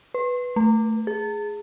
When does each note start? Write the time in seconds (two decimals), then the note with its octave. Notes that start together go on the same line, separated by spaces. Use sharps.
0.14 B4
0.56 A3
1.07 G#4